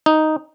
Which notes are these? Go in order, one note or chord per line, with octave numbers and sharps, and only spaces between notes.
D#4